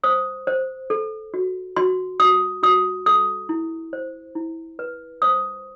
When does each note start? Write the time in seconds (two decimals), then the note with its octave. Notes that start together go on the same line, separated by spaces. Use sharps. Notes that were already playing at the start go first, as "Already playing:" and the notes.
0.04 C5 D#6
0.47 C5
0.90 A4
1.34 F#4
1.76 F#4 C6
2.20 F#4 D#6
2.63 F#4 D#6
3.06 A4 D#6
3.49 E4
3.93 C5
4.35 E4
4.79 B4
5.22 C5 D#6